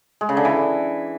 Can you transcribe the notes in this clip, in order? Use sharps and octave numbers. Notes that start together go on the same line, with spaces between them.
G#3
C#3
D3
E3